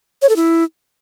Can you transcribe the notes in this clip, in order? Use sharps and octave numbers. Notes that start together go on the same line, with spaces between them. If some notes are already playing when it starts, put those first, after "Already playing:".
C#5
A4
E4